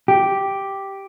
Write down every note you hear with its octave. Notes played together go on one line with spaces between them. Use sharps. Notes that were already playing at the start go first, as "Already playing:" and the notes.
G4